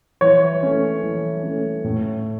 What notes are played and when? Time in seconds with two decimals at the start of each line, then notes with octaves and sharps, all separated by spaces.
0.21 E3 C#5
0.63 A3 C#4
1.03 E3
1.43 A3 C#4
1.84 A2